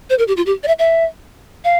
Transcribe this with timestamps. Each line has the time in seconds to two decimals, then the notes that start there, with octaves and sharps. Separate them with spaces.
0.10 C5
0.19 A#4
0.28 G4
0.37 F4
0.46 G4
0.63 D5
0.68 E5
0.79 E5
1.64 F5